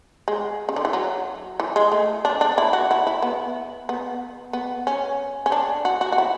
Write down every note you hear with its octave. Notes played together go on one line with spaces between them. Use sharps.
G#3
C#3
D3
E3
F#3
E3
G#3
A3
D4
D4
E4
F#4
E4
E4
B3
B3
B3
C#4
C#4
D4
F#4
F#4
F#4
E4